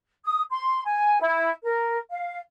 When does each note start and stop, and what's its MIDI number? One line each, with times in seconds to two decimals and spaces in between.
0.24 0.43 87
0.50 0.81 84
0.85 1.20 80
1.20 1.49 64
1.64 1.96 70
2.10 2.38 77